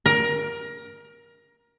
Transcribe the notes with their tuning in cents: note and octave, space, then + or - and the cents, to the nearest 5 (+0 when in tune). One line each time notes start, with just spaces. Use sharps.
A#4 +20